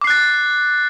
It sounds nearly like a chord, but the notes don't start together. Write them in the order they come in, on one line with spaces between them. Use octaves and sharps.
D6 C7 F#6 A6